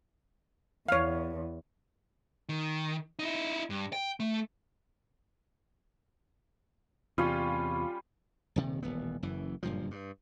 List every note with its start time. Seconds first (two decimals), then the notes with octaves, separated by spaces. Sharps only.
0.89 E2 C#5 F5
2.49 D#3
3.19 D#4 E4
3.70 G2
3.93 G5
4.20 A3
7.18 E2 C3 G3 C#4 F4
8.56 D#1 C3 D#3
8.83 D#1 A1 B3
9.23 F#1 F#2 E3
9.63 F#1 G2 A#2 F3
9.91 G2